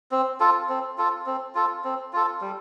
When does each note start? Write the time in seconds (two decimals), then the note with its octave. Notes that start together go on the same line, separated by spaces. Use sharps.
0.11 C4
0.40 F4 A4
0.69 C4
0.98 F4 A4
1.26 C4
1.55 F4 A4
1.84 C4
2.13 F4 A4
2.41 G3